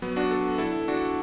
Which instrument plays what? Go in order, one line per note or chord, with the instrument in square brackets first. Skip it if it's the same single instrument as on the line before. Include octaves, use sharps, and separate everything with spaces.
[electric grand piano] F#3 B3
D4 F#4
A4
E4 A4
D4 F#4